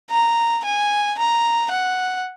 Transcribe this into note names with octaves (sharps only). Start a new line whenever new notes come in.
A#5
G#5
A#5
F#5